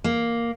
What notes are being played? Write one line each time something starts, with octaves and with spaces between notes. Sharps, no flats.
A#3